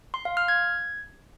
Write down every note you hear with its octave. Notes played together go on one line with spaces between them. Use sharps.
C6
F5
F6
G#6